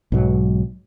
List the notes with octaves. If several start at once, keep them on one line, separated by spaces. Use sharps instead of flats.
B1 G#2 F#3